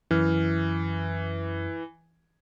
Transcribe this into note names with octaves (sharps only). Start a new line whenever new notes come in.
F#2 E3 F6